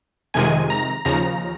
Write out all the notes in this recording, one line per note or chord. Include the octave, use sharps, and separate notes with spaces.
F2 C3 D#3 G#3 G#5
A#5
D#2 C#3 F3 A#5